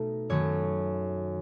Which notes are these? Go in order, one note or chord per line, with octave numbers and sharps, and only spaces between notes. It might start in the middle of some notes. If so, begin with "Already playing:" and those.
Already playing: B2 A3 D#4
F#2 D#3 A3 C#5